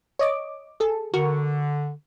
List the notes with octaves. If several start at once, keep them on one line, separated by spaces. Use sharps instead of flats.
C#5 D#5 D6
G#4 A4
D3 F#4 A#4 C#6